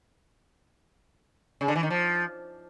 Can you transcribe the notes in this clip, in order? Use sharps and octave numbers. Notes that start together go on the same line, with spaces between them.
C#3
D3
E3
D#3
F3